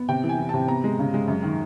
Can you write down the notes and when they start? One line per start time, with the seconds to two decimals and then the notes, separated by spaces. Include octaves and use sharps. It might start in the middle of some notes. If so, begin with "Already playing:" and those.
Already playing: B3
0.09 C3 G5
0.24 E3
0.29 G#5
0.38 E3
0.49 C3 A5
0.68 B3 A#5
0.84 G#3
0.99 C#3
1.14 G#3
1.28 F#2
1.43 D#3